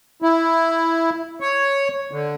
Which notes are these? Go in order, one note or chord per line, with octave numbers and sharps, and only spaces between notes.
E4
C#5
D3